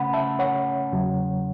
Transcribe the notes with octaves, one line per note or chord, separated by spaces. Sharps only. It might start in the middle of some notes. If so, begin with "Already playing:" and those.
Already playing: C#3 A3 C#4 F#5 B5
E5 A5
C#5 F#5
E2 C#3 F#3